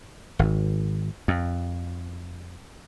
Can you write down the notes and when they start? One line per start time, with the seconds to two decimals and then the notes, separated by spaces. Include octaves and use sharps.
0.39 G#1
1.28 F2